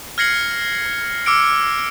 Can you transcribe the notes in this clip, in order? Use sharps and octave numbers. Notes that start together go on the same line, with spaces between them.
F6 G#6 A#6 C7 C#7 F#7
D6 E6 F6 C#7 D7